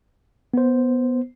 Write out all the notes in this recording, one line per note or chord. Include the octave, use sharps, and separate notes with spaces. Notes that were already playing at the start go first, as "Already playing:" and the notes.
B3 C5